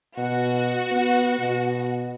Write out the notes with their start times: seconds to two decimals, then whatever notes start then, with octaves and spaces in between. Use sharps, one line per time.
0.18 B2 F#4
0.92 B3
1.39 B2